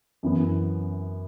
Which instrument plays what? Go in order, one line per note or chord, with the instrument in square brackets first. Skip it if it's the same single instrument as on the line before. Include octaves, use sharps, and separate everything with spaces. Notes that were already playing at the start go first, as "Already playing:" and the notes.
[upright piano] F#2 E3 B3